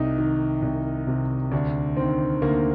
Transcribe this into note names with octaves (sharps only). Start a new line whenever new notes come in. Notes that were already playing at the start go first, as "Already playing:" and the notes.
Already playing: C2 D#4
D#3
C2
C3
D2 D4
D#3 C4
D2 A#3